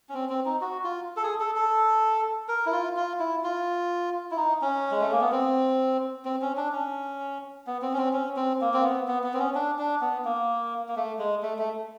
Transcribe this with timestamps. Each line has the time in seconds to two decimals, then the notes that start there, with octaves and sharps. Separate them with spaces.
0.09 C#4
0.14 C4
0.29 C4
0.45 D#4
0.61 F#4
0.84 F4
1.17 A4
1.23 G#4
1.40 A4
1.56 A4
2.48 A#4
2.66 E4
2.72 F4
2.96 F4
3.19 E4
3.44 F4
4.31 E4
4.37 D#4
4.61 C#4
4.91 G#3
5.01 A3
5.12 A#3
5.21 B3
5.32 C4
6.25 C4
6.42 C#4
6.57 D4
6.72 C#4
7.67 B3
7.82 C4
7.93 C#4
7.98 C4
8.13 C#4
8.36 C4
8.61 A#3
8.74 C4
8.83 B3
9.08 B3
9.24 B3
9.34 C4
9.39 C#4
9.55 D4
9.79 D4
10.01 B3
10.25 A#3
10.89 A#3
10.96 A3
11.19 G#3
11.42 A3
11.58 A3